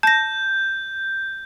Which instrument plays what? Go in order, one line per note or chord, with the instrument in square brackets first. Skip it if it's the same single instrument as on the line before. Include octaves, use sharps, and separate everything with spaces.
[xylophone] A5 A#6 [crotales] G6